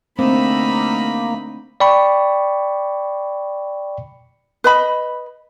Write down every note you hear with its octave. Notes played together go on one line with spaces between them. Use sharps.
D3 A3 A#3 C4 D#4 B5
D5 G5 B5 C#6
B4 D#5 B5